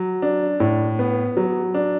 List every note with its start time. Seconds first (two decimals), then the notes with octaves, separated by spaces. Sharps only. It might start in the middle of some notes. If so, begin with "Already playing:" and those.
Already playing: F#3
0.22 D4
0.60 A2
0.99 B3
1.37 F#3
1.74 D4